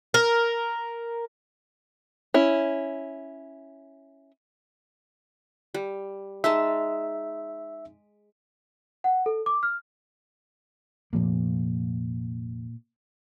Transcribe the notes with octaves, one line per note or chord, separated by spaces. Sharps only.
A#4
C#4 E4
G3
G#3 D#4 E5 A5
F#5
A4
D6
F6
F1 A#2 F3 A#3